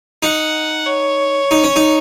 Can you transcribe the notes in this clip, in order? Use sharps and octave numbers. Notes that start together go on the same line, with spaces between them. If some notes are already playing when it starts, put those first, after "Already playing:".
D#4 F#5
C#5
D#4
C#4
D#4